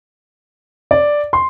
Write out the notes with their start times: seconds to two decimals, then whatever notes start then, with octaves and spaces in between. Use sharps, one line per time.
0.91 D5
1.33 C6